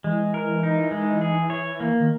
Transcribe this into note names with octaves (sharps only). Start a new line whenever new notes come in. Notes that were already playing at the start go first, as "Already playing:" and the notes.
E3 G#3
A#4
D#4
G#3
G#4
C#5
A#3
D#3